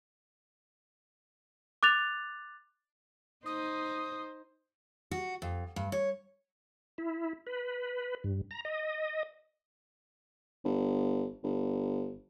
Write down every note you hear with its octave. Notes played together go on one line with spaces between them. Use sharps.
D6 F#6 A6 F7
D#4 C5 D#6
F#4
F2
G2
C#5
E4
B4
G2
A#5
D#5
G1
G1